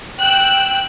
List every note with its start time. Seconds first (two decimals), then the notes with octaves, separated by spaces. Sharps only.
0.20 G5 E6 F#6